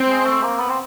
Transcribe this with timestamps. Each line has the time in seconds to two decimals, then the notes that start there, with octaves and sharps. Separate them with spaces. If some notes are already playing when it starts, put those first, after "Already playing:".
Already playing: C4
0.08 G#3
0.25 A3
0.43 A#3
0.60 B3
0.69 C4